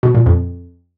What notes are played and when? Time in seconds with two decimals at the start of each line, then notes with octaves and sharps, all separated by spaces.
0.03 B2
0.15 A#2
0.26 F2